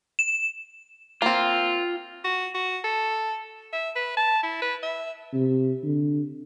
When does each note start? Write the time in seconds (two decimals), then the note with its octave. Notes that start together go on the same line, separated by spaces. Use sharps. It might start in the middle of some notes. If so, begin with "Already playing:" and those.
0.19 E7
1.22 A#3 C4 F4
2.25 F#4
2.55 F#4
2.84 A4
3.73 E5
3.96 B4
4.17 A5
4.43 E4
4.62 B4
4.83 E5
5.33 C3
5.84 D3